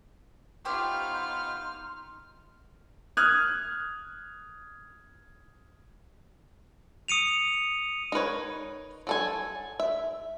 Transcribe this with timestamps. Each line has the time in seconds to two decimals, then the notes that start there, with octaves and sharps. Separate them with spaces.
0.65 B3 D#4 F4 G4 C5 C#5 C6 F6
3.17 D#6 F6 F#6 G#6
7.08 D#6 C#7 D#7 F7
8.12 D#4 A#4 B4 C#5
9.07 F#3 A4 G#5
9.80 E5